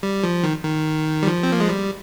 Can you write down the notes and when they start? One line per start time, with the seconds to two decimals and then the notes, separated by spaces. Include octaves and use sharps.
0.03 G3
0.23 F3
0.43 D#3
0.63 D#3
1.23 G3
1.27 F3
1.43 C4
1.52 A#3
1.60 G#3
1.69 G3